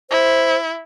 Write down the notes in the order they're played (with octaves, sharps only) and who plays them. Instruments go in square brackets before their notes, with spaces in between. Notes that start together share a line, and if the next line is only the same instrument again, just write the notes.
[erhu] E4 [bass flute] C5